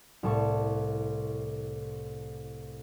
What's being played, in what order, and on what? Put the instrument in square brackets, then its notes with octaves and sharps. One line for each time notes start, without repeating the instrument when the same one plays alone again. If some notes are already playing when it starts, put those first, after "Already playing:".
[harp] C2 A2 A5 C#6